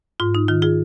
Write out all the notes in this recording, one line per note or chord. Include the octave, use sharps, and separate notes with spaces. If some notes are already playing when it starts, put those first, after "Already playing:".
G#2 F4
D#4
D#3 F4
F4 G#4